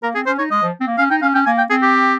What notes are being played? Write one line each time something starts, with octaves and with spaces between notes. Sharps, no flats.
A#3 A#4
C4 G#4
C#4 C5
D#4 C#5
G#3 D#5
F3
C4
A#3
C#4 F5
D#4 G5
C#4 F5
C#4 G5
A#3 G#5
G5
C4 G#4
G4